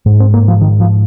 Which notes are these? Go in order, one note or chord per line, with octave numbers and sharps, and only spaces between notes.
G#2
C4
A#3
F3
D#3
F3